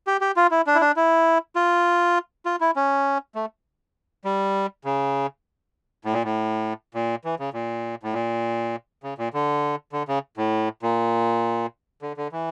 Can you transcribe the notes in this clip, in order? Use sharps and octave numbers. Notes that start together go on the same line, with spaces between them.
G4
G4
F4
E4
D4
E4
D4
E4
F4
F4
E4
C#4
A3
G3
C#3
A2
A#2
A2
A#2
E3
C#3
A#2
A2
A#2
C#3
A#2
D3
D3
C#3
A2
A#2
D3
D3
E3